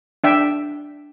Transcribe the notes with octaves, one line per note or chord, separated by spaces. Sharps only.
D4 E5 G5